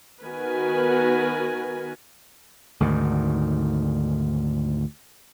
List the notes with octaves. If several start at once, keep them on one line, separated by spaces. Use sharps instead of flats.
D#3 B3 F#4 A#4 B4 G#5
D2 G#2 D#3